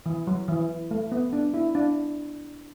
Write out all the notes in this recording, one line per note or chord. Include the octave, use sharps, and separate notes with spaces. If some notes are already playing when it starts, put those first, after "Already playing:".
E3
F#3
E3
A3
B3
D4
E4
D4